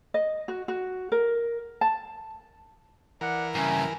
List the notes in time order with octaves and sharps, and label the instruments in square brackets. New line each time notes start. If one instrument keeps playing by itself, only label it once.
[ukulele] D#5
F#4
F#4
A#4
A5
[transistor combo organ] E3 A#4 [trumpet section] D5 F#5
[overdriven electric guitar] G2 C#3 [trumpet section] E5 A#5 [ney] G#5